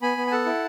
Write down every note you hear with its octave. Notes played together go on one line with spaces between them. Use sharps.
B3 G#5 B5
B3
G#5
A4 F#5 A5
E4